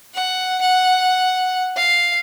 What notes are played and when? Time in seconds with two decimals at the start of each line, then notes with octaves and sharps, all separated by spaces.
0.14 F#5
0.61 F#5
1.76 F5